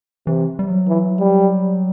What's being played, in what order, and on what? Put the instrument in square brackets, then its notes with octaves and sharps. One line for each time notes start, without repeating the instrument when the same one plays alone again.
[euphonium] C3 [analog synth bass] E3
[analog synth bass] G3
F#3
[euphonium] E3
G3